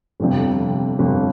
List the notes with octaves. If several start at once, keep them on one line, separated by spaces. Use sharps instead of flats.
G1 F2 C3
G1 F2 C3